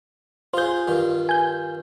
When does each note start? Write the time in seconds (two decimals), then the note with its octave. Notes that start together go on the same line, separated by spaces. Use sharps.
0.54 F4 G#4 C5 G6
0.87 G2 D#3 F4
1.29 G#5 G6